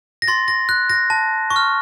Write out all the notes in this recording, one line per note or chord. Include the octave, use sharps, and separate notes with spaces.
A#6
C6 A6
A#6
F#6
A#6
A5
C#6
F6